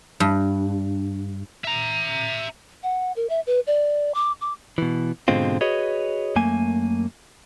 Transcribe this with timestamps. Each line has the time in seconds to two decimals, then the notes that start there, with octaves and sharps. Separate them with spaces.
0.20 G2
1.65 E5 A#5
2.83 F#5
3.16 A#4
3.29 E5
3.47 B4
3.67 D5
4.14 D6
4.41 D6
4.78 B2 E3
5.28 G#2 B2 D3 G#3 C4 F4
5.61 F#4 G#4 B4 C#5 D#5
6.36 F#2 A3 A#3 G#5